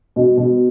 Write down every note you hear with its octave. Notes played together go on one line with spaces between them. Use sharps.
B2
B2